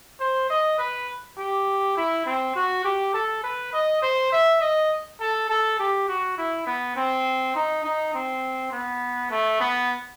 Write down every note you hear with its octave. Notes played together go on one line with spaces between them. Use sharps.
C5
D#5
B4
G4
E4
C4
F#4
G4
A4
B4
D#5
C5
E5
D#5
A4
A4
G4
F#4
E4
B3
C4
D#4
D#4
C4
B3
A3
B3